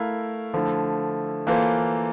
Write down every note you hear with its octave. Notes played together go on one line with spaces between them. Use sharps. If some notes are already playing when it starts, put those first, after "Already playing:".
Already playing: A3 E4 A#4 F5
D3 F3 A3 E4
E3 A#3 F4 A4 C5